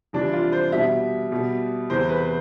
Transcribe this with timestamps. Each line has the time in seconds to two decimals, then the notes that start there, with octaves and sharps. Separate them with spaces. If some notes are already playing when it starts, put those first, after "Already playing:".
0.13 F2 C3 E3 G3 D4
0.33 F4
0.52 C5
0.72 B2 G3 E5
1.31 B2 G3
1.90 E2 C3 E3 C5
2.09 B4